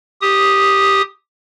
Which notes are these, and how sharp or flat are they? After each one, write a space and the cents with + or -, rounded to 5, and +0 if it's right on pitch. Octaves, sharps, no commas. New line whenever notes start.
G4 +0 D#6 +0